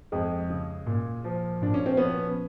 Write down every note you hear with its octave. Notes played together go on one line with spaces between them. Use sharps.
F2 G#3
C#3
A#2
F3
A#2 D4
C#4
C4
F3 B3 C#4